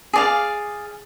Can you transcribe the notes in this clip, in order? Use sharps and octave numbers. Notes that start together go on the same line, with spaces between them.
G#4 D5 F5